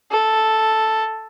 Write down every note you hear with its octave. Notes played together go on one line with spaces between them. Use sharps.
A4